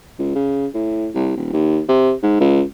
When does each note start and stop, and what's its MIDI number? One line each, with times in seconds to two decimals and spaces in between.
0.19 0.32 37
0.35 0.67 49
0.74 1.08 45
1.14 1.32 36
1.36 1.48 27
1.53 1.80 39
1.88 2.13 48
2.23 2.35 44
2.40 2.62 37